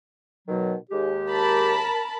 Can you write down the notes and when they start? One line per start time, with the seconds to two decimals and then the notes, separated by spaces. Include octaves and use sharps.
0.48 B2 D#3 F#3
0.91 D#2 G#3 G4
1.30 A#4 A5 B5